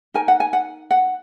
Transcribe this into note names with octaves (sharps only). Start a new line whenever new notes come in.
D#4 A#4 G#5
F#5
G#5
F#5
F#5